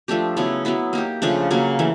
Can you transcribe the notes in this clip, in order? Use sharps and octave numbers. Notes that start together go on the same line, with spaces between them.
F3 A3 D4 G4
C#3 F#3 B3 E4
F#3 B3 E4
A#3 D#4 G4
C#3 F3 A3 D4
C#3 F#3 A#3
E3 A3